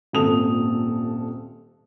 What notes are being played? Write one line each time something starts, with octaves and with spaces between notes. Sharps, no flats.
D#1 G#1 A#2 A4 D#6 F7